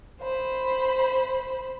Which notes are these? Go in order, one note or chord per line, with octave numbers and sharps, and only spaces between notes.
C5 B5